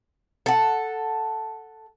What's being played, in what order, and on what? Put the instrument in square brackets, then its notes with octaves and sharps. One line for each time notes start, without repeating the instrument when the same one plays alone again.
[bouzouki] A4 F#5